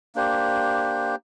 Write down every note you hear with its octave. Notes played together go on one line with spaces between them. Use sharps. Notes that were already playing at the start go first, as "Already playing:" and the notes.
A#3 D4 G4 C5